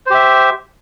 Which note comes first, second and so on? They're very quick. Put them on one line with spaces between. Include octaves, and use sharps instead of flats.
C5 G4 E5